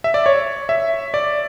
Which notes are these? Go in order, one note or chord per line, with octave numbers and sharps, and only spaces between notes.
E5
D5
C#5
E5
D5